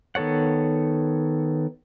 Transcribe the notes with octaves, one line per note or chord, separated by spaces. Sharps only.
D#3 B3 A4 C#5 F#5